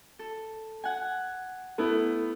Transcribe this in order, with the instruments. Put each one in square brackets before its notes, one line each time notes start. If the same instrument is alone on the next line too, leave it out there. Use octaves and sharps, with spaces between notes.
[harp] A4
F#5 G#5
[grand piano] A3 B3 E4